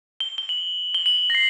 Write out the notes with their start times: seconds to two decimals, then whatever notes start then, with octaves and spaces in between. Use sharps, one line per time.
0.20 G7
0.38 G7
0.49 F#7
0.95 G7
1.06 F#7
1.30 A#6
1.35 C7